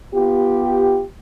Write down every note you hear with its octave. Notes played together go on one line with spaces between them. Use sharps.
B3 F4 G4